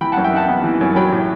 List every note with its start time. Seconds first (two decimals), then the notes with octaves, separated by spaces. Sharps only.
0.01 E3 G5 B5
0.12 F#5 A5
0.17 F#2
0.24 E5 G5
0.32 D#4 F#5 A5
0.48 B3
0.64 E3
0.81 F#2
0.96 F#3 G5 B5
1.12 A2